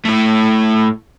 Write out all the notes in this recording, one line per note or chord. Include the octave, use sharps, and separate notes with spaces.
A2 A3